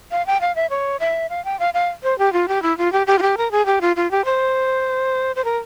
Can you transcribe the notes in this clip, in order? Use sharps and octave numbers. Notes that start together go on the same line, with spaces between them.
F5
G5
F5
E5
C#5
E5
F5
G5
F5
F5
C5
G4
F4
G4
E4
F4
G4
G4
F4
G4
A#4
G#4
G4
F4
F4
G4
C5
C5
A#4